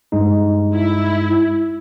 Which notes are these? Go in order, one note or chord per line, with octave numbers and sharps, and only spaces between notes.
G2 G#3 D#4
E4